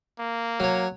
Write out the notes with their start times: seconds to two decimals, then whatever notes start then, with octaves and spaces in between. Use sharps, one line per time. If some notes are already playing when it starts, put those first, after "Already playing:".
0.20 A#3
0.60 F#3 C#5